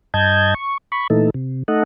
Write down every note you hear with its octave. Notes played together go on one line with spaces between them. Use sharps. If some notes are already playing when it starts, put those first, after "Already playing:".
G2 D#5 A5 G6 G#6
C#6
B5 C#6
A#2 E3 A3 D#4 A4
C3
A3 D#4 A4 D#5 F#5